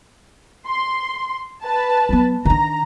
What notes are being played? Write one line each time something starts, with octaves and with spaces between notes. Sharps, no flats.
C6
B4 A5
F#3 B3
D#3 D4 A#5